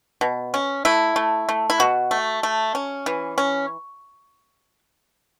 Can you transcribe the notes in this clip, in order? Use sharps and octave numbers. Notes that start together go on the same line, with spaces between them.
B2
C#4
A3 E4
A3
A3
E4
B2 F#4
A3
A3
C#4
E3
C#4